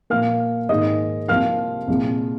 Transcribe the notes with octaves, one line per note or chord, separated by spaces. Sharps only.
A#2 F3 A#3 F5 F6
G#2 D#3 A#3 D#5 D#6
C2 C3 F3 A#3 F5 F6
C2 A#2 F3 G#3